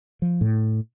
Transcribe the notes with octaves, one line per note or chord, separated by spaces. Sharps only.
F3
A2